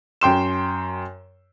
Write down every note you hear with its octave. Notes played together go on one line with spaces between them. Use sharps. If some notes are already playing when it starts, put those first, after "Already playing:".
F#2 G5 C6 E7